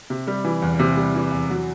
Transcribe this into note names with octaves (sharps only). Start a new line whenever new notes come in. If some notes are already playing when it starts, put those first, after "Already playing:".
C3
G3
E3
E2
C3
G3
E3
E2
F#3